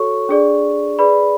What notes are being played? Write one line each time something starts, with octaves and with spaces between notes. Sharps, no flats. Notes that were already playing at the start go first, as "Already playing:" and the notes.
Already playing: F#4 A4 C#5 C#6
D4 G#4 D5
G#4 B4 D5 B5